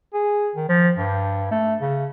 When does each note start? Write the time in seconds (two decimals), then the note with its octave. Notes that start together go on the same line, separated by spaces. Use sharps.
0.14 G#4
0.55 D#3
0.69 F3
0.96 G2
1.51 A3
1.81 C#3